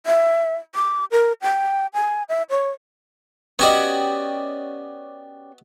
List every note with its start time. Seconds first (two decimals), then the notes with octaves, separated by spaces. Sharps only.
0.06 E5
0.75 D6
1.12 A#4
1.42 G5
1.94 G#5
2.29 E5
2.50 C#5
3.59 B3 C#4 F#4 G4 D5 D#5